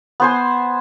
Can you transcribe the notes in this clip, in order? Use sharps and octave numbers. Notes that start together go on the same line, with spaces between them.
B3 C5 G#5